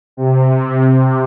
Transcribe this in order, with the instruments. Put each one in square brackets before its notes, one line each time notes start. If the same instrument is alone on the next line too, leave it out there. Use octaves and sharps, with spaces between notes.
[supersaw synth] C3